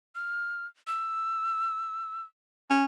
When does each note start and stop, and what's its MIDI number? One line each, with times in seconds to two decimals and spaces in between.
0.15 0.66 89
0.87 2.22 88
2.70 2.85 61